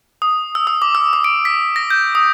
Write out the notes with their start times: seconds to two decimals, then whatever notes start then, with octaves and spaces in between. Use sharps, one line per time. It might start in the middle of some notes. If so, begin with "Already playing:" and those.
0.22 D#6
0.55 E6
0.67 D#6
0.82 D6
0.95 E6
1.13 D#6
1.24 D7
1.45 B6
1.76 A#6
1.90 G6
2.15 D#6